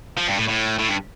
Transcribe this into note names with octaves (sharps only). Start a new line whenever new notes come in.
F3
G2
A2
A2
A2
G2